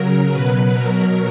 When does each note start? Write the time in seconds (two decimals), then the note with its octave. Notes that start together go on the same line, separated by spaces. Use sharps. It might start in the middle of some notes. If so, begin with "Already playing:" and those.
Already playing: C#3 F#3 A#4
0.31 B2 F#3 B4
0.73 B2 F#3 A#4